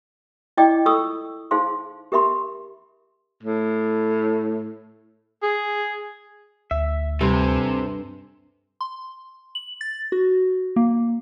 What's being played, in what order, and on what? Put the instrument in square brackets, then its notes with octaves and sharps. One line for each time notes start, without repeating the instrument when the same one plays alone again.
[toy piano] E4 D5 D#5 G5 D6
F4 A4 C#6 D#6 E6
D#4 G#4 C5 F5 C6
G4 A#4 E5 B5 C6
[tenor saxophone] A2
G#4
[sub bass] D2 [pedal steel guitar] E5
[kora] G2 [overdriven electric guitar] C3 [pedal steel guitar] A4 C5 G#5
[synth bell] C6
F#7
A6
F#4
A#3